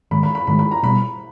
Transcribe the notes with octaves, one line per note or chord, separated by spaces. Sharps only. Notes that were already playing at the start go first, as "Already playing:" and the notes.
G#2 D#3 G#3 B5
B5
B5
G#2 D#3 G#3 B5
B5
A#5
B2 G3 B3 B5